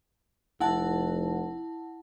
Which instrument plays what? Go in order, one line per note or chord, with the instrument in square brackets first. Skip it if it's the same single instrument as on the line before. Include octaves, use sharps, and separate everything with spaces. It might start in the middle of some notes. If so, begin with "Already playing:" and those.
[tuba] F1 [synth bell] E4 F#5 A5